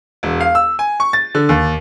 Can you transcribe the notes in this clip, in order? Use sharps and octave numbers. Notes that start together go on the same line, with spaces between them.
E1
F5
E6
G#5
C#6
A6
D3
D#2